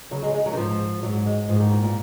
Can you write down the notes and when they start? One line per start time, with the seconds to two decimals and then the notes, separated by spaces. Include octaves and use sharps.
0.11 C#3 F#3
0.23 G#3
0.34 G#3
0.46 F#3
0.53 D#3
0.57 G#2 F3
1.03 G#2 F#3
1.26 G#3
1.49 G#2 F3
1.60 D#3
1.71 A#2
1.83 A#2